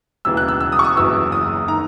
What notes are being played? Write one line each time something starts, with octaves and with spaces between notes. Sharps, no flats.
E1 D#2 C#3 E3 E6
F#6
E6
E6
D#6
C#6
D#6
F#1 F#2 E3 E6
D#6
D#3 A#5